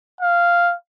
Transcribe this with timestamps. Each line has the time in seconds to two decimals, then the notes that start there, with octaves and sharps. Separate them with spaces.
0.21 F5